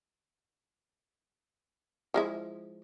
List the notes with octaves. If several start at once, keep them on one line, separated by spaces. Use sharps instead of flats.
F3 G#3 E4